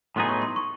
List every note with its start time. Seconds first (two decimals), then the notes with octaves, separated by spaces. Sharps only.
0.16 A2 F#3 B3 D#4 G#4 C6
0.29 C#6
0.42 C6
0.56 C#6